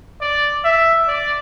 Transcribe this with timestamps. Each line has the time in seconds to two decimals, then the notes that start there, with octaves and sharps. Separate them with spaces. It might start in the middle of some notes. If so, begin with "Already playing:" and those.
0.21 D5
0.64 E5
1.08 D5